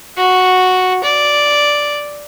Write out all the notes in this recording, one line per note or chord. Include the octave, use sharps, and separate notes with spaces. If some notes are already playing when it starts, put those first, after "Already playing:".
F#4
D5